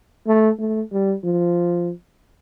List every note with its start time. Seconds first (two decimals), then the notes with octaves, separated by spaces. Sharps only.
0.27 A3
0.59 A3
0.92 G3
1.24 F3